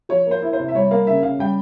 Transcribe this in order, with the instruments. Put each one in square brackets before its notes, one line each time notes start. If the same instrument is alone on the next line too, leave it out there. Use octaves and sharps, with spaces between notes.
[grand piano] F3 C#5
A#3 C5
E4
C5
C3
E5
G3 C#5
A#3 F5
C#3 E5
C#3 F5
G3 G5